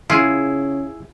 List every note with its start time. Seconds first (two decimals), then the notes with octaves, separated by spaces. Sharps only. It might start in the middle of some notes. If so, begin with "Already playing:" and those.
0.10 C#3 E4 F4 G#4